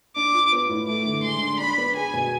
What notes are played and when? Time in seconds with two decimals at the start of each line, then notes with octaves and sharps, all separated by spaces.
0.16 D4 D6
0.34 F4
0.52 B3
0.69 A2
0.88 A3 D6
1.06 D3
1.24 G#3 C6
1.42 D4
1.60 D4 B5
1.78 B3
1.95 G#4 G#5
2.14 B2